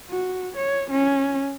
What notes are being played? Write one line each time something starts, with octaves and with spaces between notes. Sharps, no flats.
F#4
C#5
C#4